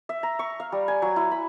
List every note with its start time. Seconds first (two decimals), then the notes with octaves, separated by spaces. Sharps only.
0.09 E5
0.23 A#5
0.39 C#6
0.60 F5
0.72 G3
0.88 G#5
1.02 F#3
1.16 E4
1.31 B5